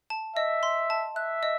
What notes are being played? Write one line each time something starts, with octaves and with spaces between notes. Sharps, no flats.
A5
D#5 E5
C6
A5
E5 F#6
D#5